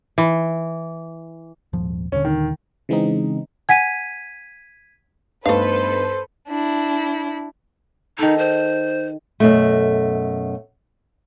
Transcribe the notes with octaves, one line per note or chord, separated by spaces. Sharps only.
E3
D#1 G#2 F3
D#1 D3 C#4
D#3
C#3 E3 G#3 C4 D#4
F#5 G#5 G#6 B6 D#7
G2 A3 B3 D#4 A4 B4 C5 F5
D4 E4
D#3 D#4 A4
C5
F#2 B2 A3